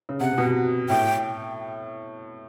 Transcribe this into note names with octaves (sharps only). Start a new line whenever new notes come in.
C#3
C3 F#5
C3
B2
A2 G5